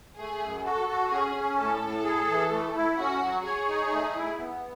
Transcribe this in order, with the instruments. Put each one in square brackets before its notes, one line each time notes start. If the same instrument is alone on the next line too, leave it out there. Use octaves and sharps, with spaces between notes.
[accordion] A3 [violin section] G#4
[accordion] F#2
[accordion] F#4 [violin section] A4
[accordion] F#4
[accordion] C#4 [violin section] G#4
[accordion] C#4
[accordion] A2 [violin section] A4
[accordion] A2
G#4
E3
A3
E4
[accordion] C#4 [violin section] F#4
[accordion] F#3
[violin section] G#4 [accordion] C#5
[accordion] D#4
A3
E4
B3